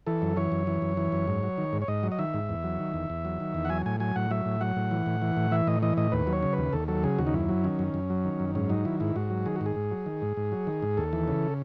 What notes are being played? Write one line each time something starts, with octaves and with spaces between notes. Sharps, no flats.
E3 A4
F#2
E3 C#5
F#2
E3
F#2
E3
F#2
G#2
F#3
D#3
G#2
C#5
G#2 D#5
F#3
D#5
D#3 E5
G#2
E2
F#3
D#3
E2
E2
F#3
D#3
E2
F#5
F#3 G#5
A2 G#5
F#3 G#5
A2 F#5
F#3 E5
A2
F#3 F#5
A2
E3
A2
E3
A2
E3 E5
A2 D#5
E3 D#5
A2 D#5
D#2 B4
F#3
C#5
C#3
B4
D#2
D#2 A4
F#3 A4
C#3 G#4
D#2 F#4
D#4
F#2 E4
F#3
D#3 C#4
F#2
F#2
F#3
D#3
F#2
G#2 C#4
F#3 D#4
D#3 E4
G#2 E4
G#2 F#4
F#3
D#3 G#4
G#2 F#4
G#4
G#2
F#3
D#3
G#2
G#2
F#3
D#3
G#2
D#2 A4
E3
C#3